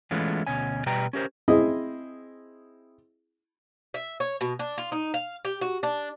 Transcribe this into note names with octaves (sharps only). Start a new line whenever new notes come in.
E3 G#3 A3 B3 C#4 F4
D2 B2 C#4 G#5
B2 G3 B4 G5 A#5
C#4 G4 A#4 C5
C4 E4 G#4 D#5
E5
C#5
B2
D4
F4
D#4
F5
G4
F#4
D4